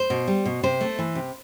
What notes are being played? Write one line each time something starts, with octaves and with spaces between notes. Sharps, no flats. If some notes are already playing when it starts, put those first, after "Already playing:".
Already playing: C5
B2
G3
B2
C3 C5
A3
E3
C3